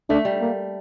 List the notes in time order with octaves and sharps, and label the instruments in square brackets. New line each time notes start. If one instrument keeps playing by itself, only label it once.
[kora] A3 [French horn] D4
[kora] G3
[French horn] A#3